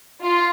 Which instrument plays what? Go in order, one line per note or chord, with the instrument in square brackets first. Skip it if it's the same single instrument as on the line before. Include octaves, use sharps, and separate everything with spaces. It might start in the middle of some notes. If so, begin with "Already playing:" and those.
[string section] F4